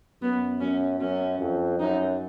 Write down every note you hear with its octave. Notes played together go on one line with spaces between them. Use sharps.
F#2 B3
F#2 C#4
F#2 C#4
F2
F#2 D#4